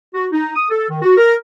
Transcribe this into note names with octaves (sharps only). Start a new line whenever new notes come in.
F#4
D#4
D#6
A4
D#3
F#4
A#4